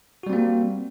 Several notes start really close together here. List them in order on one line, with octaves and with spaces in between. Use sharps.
F#4 G3 C4 A#3